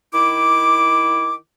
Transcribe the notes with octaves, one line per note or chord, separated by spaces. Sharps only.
D#3 E4 D6